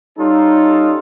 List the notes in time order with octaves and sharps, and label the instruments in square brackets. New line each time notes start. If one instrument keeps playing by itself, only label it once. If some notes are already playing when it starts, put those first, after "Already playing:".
[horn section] G3 C#4 D#4 F4 A4